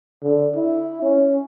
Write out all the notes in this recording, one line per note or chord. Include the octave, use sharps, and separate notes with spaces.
D3
E4
C#4